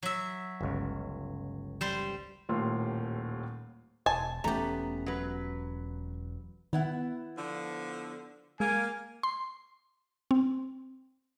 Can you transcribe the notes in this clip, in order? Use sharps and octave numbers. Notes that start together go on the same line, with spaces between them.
F#3 E5
G1 C#2
G3 C5 C6
D#1 D#2 A2 F4 C6 E6
E1 G#5 A5
E1 E3 A3 B3 C#4 G4 A#5
F#3 B4
D#3 B3 E4 F#5
D3 F3
G#3 A#3 G#5
C6
C4